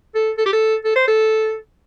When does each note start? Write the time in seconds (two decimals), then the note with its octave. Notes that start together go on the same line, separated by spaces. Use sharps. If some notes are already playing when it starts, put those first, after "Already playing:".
0.15 A4
0.38 A4
0.46 G4
0.53 A4
0.84 A4
0.96 C5
1.07 A4